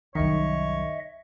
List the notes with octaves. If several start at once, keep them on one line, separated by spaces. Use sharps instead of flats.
C2 F#2 D#3 C#5 D#5 E5